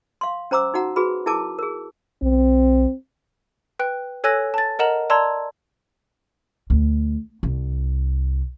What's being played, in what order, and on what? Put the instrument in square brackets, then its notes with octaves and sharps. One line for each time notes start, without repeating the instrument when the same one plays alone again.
[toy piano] F5 C6
C#4 C5 A#5 D6 E6
D#4 F#4 F#5 A#5
F#4 G#4 B4 B5
E4 G#4 A#4 A5 D6
G#4 A#4
[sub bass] B1 [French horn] C4
[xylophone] B4 G5 F#6
A4 C#5 G#5 E6 F#6 A#6
A5 A6
A#4 D#5 F#5 A#5 E7 F#7
D5 A5 A#5 C6 E6 G#6
[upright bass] D2
C2